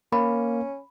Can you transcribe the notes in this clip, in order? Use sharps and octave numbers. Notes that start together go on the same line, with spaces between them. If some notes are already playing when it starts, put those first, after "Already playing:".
A#3 C#4 B5